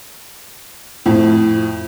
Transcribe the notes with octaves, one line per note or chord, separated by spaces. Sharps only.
F2 A2